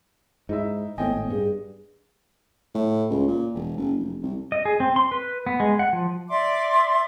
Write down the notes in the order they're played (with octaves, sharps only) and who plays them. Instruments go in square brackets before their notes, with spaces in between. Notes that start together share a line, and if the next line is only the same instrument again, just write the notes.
[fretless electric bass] G#2 [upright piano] D#4 E4 E5
[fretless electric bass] G#1 A2 C4 [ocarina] B3 [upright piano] D#5 G5 G#5
[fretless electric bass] G2 [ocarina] G#4
[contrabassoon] A2
C#2
A#2
E1
F#1
F1
C2
[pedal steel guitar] D#5
G#4
C4
C6
B4
B3
G#3
F#5
F3
[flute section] D5 E5 C6 D6